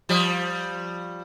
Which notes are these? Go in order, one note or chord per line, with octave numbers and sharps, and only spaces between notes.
F3 G3